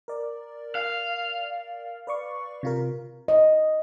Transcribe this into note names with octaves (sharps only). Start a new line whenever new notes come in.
A#4 D5
F5
B4 D5 C#6
C3 F4 A#4
D#5